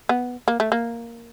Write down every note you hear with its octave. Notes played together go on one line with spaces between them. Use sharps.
B3
A#3
A3
A#3